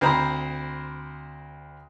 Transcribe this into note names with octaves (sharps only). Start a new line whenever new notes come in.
D2 C4 C5 A#5 B5